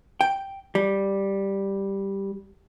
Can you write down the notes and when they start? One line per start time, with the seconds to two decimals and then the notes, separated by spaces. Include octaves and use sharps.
0.21 G5
0.75 G3